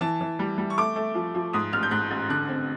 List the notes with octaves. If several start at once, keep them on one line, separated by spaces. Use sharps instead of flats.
E3 A5
E3
G3
G3
C#6
A3 D6
A3
F3
F3
G#2 D#6
A1 F6
G6
G#2 F#6
A1
D3 F#6
C4